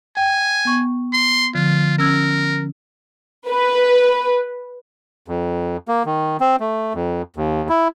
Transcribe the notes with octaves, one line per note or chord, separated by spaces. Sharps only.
G5 G#5
B3 C#6
C6
D3 F3 F4
C#4 A#4 E6 G#6
B4
F2
A#3
D#3
C4
A3
F2
D#2
E4